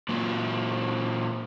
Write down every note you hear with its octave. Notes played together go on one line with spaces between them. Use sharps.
A#2 F#3